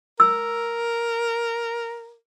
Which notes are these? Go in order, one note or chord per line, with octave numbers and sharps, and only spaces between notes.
A#4 E6